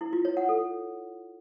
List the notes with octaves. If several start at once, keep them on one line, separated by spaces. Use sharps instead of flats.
E4
F4
C#5
F#5
A4